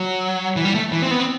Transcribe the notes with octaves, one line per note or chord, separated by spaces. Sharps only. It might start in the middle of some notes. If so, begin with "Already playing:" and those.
Already playing: F#3
E3
G3
A3
E3
C4
B3
C4